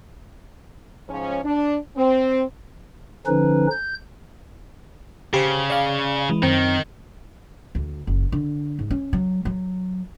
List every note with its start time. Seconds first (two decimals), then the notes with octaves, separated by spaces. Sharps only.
1.08 G#2 F3 C#4
1.44 D4
1.96 C4
3.27 D3 F3 C#4 D#4 B4
3.71 G6
5.34 C#3 G4 C5
5.70 D5 F5
6.29 E3 G#3
6.43 F#2 D#3 C4
7.75 D2
8.07 F#1
8.32 D3
8.79 G#2
8.91 C#4
9.13 F#3
9.45 F#3